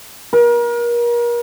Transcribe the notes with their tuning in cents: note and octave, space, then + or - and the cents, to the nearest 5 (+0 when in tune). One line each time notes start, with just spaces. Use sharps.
A#4 +35